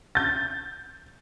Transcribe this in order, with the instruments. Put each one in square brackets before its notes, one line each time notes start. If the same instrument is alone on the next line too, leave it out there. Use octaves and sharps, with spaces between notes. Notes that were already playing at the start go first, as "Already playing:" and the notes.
[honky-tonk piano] G6 A6